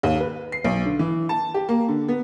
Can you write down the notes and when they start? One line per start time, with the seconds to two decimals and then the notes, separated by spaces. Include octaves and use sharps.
0.03 D#2
0.20 B4
0.52 C7
0.64 B1
0.86 D3
0.99 E3
1.29 A5
1.54 G4
1.69 A#3
1.88 D3
2.08 B3